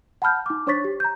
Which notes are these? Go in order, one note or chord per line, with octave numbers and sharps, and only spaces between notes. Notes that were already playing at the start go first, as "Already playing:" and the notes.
F#5 A5 B5 F6 G6
D#4 D6
D4 C5 C#5 C#6 A6 B6
G4
A#5 G6